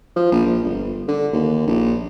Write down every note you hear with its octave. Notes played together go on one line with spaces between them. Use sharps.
F3
A#1
A#1
G1
D3
D#2
A#1